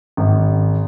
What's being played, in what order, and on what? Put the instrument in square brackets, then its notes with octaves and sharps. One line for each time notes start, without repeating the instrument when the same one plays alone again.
[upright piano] G#1